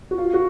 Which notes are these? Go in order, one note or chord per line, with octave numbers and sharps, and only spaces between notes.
F#4
F4
F#4